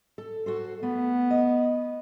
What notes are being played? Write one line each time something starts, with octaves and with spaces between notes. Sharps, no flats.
A4
F#4 A4 C5
A3 B3
D#5